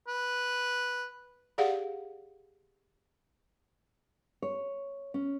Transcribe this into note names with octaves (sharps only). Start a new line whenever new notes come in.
B4
G4 G#4 D5 F5 F#5
C#5
C#4